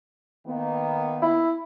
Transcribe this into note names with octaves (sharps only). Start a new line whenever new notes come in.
D#3 A#3 B3
E4